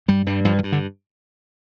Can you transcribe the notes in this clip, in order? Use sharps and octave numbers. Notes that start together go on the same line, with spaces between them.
G2 G3
G2 G3
G2 F3
E3
G2
D3